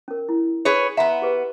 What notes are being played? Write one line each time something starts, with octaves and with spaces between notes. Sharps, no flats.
C#4 A#4
E4
G#4 B4 C#5
B3 E5 F#5 A#5 C6
G4 G#4 B4